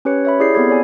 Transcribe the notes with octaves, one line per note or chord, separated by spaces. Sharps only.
C#4 G4 B4 C#5 C#7
C#5 E5 B5
E4 G4 G#4 D5 G6 C7
B3 C4 G4 A4 B5 G#6
C4 C#5 D5 G#5